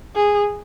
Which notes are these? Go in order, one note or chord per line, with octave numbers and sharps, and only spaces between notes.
G#4